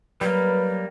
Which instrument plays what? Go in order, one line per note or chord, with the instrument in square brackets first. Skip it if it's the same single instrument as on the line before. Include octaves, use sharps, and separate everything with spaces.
[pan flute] F#3 [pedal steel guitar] G3 A#3 [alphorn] B4